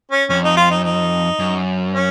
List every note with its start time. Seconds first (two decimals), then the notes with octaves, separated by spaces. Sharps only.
0.12 C#4
0.29 F2 C#4
0.44 D#4
0.57 F4
0.71 D#4
0.84 D#4
1.39 F#2
1.94 C#4